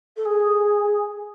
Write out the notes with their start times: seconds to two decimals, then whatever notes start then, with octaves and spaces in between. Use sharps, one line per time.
0.16 A4
0.25 G#4